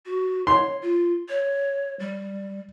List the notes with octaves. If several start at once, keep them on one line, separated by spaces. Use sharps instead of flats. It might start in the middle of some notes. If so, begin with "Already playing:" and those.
F#4
C#5 C6
F4
C#5
G3